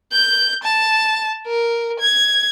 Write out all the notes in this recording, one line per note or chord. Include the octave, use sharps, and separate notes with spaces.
G6
A5
A#4
G#6